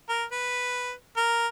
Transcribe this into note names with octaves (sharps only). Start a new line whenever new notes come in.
A#4
B4
A#4